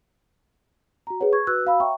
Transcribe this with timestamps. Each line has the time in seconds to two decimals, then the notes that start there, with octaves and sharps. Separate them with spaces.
1.07 F#4 A#5
1.20 G#4 B4 C#5 F#5
1.33 C#6 G#6
1.47 F#4 B4 E6 F#6
1.65 F#4 F5 B5 E6
1.80 C#5 E5 F#5 G5 A#5 C#6